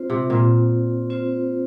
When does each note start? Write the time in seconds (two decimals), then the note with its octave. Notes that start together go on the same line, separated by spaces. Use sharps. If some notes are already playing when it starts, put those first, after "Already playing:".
Already playing: C4 F4 C5
0.10 C3
0.30 A#2 C4 F4 C5
1.10 C4 F4 C5